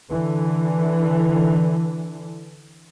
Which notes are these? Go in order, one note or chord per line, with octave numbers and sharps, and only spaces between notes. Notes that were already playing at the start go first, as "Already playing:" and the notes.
D3 E3